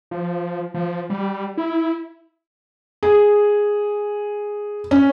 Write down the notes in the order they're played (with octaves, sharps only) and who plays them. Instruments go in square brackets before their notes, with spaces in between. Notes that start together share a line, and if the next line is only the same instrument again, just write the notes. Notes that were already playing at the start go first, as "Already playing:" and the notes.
[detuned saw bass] F3
F3
G3
E4
[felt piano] G#4
C#4